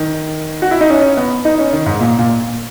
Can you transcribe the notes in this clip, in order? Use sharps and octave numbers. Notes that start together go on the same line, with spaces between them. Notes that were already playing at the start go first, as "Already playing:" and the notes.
Already playing: D#3
F#4
E4
D#4
C#4
B3
D#4
C#4
D#3
G#2
A#2
A#2